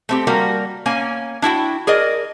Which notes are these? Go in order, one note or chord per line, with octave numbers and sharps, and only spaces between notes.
A3 C4 G4
G3 A#3 F#4 A#4
A#3 C#4 G#5
D4 E4 F#4 G5
G#4 A#4 D5 D#5